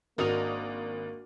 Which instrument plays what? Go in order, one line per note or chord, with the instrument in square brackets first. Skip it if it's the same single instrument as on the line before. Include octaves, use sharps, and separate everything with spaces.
[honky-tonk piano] G#1 D#6 F7 [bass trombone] A#3 [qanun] D4 F#4 D#5 [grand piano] A#4